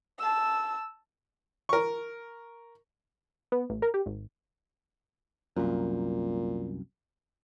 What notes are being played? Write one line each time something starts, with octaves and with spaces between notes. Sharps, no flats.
A5 E6
A#4 C#6
B3
A1
A#4
G4
G#1
C2 F#2 A#2